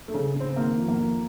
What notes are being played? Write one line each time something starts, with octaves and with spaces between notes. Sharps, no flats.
A3
C#3
C#3
C4
D#3 A#3
F2
A#3
F2